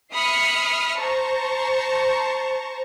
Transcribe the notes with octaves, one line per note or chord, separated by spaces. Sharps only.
E5 B5 D#6 F6 C7 C#7
C5 A5 A#5 C#6